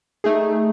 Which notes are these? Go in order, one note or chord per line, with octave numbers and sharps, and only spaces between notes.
A3 D#4 G#4